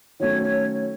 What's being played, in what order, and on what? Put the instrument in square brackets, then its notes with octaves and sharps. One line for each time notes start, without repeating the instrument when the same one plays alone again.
[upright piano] D#3 F#3 A3 C#4 [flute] C#5
[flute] C#5